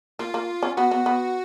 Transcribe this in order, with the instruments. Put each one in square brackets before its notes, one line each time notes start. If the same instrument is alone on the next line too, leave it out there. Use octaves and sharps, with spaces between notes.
[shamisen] A#3 [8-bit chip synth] F4
[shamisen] A#3
C#4
[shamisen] B3 [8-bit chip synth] F#4
[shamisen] B3
B3